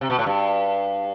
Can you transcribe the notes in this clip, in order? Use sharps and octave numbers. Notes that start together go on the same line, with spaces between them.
C3
B2
A2
G2